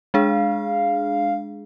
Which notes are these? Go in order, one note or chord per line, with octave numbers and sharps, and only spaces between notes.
G#3 D4 G#4 F5